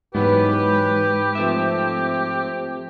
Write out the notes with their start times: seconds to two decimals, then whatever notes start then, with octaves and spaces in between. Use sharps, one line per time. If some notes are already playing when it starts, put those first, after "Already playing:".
0.15 G#2 E3 F#3 B3 G4 B4
1.35 F3 A3 C4 E5